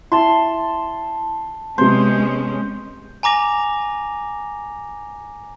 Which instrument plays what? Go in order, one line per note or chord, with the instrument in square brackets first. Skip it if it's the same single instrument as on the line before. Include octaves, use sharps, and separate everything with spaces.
[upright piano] E4 [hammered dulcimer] A5 C6
[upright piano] C3 B3 [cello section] G#3 C#4 [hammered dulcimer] C5
[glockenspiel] G#5 A#5 D6 A#6 F7